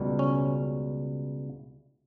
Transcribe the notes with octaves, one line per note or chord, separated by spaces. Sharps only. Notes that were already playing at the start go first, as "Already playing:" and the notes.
Already playing: C#2 B2 G3
C#4